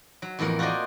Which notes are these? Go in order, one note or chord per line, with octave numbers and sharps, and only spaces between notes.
F#3
F2 A2 E3 A#3 A#4
F4 F#4 A#4 C5 D5 D#5